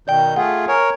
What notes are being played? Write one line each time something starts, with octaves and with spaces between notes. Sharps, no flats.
B2 D#3 D5 G5 G6
A3 F4 G#4 F#5
A#4 C#5 G#5